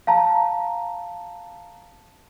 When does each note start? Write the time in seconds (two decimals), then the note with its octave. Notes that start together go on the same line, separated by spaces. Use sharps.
0.07 F5 A5 A#5